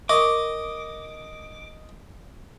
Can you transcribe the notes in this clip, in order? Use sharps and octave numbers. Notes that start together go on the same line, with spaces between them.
A#4 D#5 C#6 D6